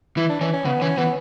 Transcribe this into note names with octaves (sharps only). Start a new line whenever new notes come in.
E3 E4
D4
E3 C#4
C#4
C#3 B3
E3 C#4
E3 B3